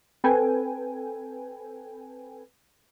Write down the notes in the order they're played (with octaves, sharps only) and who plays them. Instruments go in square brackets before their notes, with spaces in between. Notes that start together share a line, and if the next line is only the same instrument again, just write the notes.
[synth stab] C4 A4 B4 G5 G#5